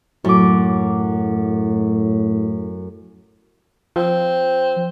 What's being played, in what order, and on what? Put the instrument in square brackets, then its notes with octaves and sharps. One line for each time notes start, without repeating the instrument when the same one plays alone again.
[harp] F#2 D6 [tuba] A2
[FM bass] F3 [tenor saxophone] C4